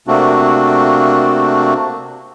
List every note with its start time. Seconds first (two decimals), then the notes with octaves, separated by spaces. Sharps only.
0.07 C3 A3 A#3 C4 D4 F#4